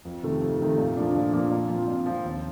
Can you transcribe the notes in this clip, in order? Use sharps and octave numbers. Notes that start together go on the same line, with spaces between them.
F2
C3 D#3 A3
F2
C3 D#3 A3
A#2
F3 A#3 D4
A#2
F3 A#3 D4
A#2
F3 C4 F4
A#2
F3 C4 F4
D#2